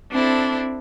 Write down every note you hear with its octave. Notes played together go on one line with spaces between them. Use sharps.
C4 D4 E4 A4